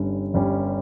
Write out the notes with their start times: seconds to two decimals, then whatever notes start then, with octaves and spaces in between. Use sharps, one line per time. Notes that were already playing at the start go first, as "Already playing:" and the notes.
Already playing: G1 G2 G3 C#4 G4
0.34 G1 G2 G3 C#4 G4